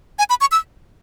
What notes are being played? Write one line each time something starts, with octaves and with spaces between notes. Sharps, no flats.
G#5
B5
C#6
E6